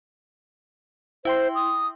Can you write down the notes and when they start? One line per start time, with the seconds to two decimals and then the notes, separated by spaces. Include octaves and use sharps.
1.25 E4 C5 G5 C6
1.55 D#6